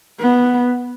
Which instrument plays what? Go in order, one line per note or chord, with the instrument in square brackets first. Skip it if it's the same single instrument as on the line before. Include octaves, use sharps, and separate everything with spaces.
[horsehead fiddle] B3